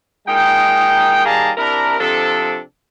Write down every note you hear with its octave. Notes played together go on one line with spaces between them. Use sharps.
A#2 G#3 D#4 G5
D#3 G3 A#3 G#4 A5 A#5
C3 D4 E4 A#4
C3 F3 D4 A4